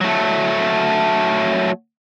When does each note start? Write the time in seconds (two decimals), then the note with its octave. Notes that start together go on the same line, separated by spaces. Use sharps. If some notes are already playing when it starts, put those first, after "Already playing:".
0.01 F#3 A3